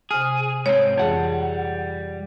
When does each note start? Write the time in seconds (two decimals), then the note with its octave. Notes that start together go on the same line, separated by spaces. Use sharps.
0.11 C3 G#4 G#5 F6
0.66 G#2 C4 C#5
0.98 F2 E3 G3 G#4 F#5